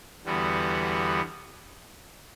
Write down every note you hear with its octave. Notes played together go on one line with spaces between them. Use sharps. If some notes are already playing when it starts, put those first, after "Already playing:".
E2 D3 G3 B3 F#4